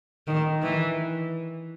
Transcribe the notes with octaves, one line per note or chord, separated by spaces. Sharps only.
D#3
E3